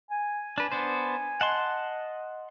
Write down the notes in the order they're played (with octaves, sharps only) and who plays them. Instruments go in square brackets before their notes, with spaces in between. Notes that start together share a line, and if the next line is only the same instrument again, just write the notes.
[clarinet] G#5
[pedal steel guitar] D4 B4
B3 D4 C5
[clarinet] D#5 [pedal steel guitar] F#5 A5 C6